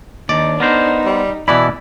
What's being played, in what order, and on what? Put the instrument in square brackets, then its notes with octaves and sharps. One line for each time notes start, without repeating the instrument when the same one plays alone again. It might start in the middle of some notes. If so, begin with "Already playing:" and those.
[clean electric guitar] D#2 [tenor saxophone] D4 [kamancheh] D#4 [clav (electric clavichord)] D5
[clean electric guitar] B3 A#4 C5 [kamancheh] D#4
[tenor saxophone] G3
[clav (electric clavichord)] B2 E3 E4 [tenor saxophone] D5 [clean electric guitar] B5